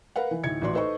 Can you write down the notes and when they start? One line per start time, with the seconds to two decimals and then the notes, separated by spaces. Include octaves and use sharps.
0.16 A#4 B4 F5 F#5
0.31 E3
0.44 D2 A2 D#4 G#6 C#7
0.62 A1 A#2 F#4 D5 C6
0.73 D#4 A4 B4 C5 D#5 C#6